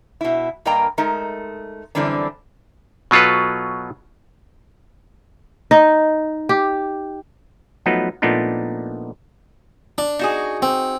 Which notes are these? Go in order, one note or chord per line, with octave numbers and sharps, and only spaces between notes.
B2 E4
G2 A#3 A#4 D#5 G5 A#5
G#3 A3 D#4 A#4
F#2 D3 E3 G3 C4 D4
B2 F#3 F4 A4 B4
D#4
G4
F3 F#3 A3 B3 D#4 B4
A#2 F3 A3 B3 D4 D#4
D4
D#4 F#4 G#4
C4